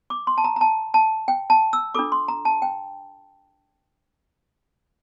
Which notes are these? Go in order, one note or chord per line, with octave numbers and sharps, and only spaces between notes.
D6
C6
A5
A#5
A#5
A5
A5
G5
A5
E6
D4 F4 A4 D6
C6
A#5
A5
G5